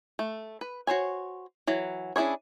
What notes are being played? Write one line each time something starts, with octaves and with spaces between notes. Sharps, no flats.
A3
B4
F#4 C5 C#5 G#5
E3 F#3
C#4 D4 E4 G#4 C#5